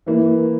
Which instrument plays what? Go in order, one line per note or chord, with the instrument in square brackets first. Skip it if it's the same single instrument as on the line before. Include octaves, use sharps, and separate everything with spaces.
[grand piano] E3 A#3 E4